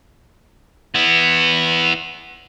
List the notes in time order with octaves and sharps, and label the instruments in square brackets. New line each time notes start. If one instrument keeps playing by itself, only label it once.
[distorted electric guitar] B3 E4